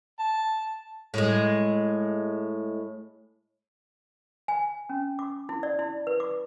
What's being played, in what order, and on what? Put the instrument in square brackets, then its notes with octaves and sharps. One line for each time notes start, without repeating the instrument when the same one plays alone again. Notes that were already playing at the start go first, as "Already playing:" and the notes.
[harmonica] A5
[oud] A2 G#3
[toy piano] G#5
C#4
D6
E4
D5
E4
B4
D6